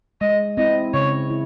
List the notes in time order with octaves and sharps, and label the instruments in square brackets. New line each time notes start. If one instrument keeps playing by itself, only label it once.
[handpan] G#3 [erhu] D#5
[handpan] C4 E4 [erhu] D#5
[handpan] C#3 [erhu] C#5
[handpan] E4